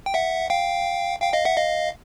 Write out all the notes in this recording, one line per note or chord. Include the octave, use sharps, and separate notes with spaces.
G5
E5 F#5
F5 G5
F5 G5
D#5 F5
E5 F#5
D#5 F5